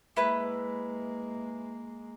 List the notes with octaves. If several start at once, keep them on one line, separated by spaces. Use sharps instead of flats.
G#3 A#3 E4 B4 F#6